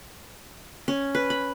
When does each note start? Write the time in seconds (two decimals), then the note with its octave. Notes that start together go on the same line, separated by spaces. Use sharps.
0.88 C#4
1.15 B4
1.30 B5